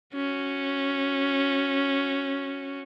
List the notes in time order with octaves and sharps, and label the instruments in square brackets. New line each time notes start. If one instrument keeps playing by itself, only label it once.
[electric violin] C#4 F#4